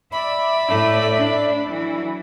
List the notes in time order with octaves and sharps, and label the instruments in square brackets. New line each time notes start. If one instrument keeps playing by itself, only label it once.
[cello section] D5 E5 [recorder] B5
[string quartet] A2 A3
D4
[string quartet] E3 [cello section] F#3